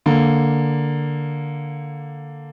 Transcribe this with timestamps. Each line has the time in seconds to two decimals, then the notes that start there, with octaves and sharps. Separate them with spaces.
0.06 D3 A#3